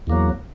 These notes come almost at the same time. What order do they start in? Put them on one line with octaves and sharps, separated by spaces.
E2 A#3 F#3